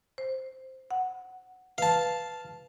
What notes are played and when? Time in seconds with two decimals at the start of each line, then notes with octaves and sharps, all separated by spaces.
0.18 C5
0.91 F#5
1.78 B4 F5 A5